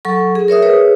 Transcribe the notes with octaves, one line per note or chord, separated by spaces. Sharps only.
F#3 A4 C#6
G#4
A#4 C#5 E5 D#6
G#4 B4 C#5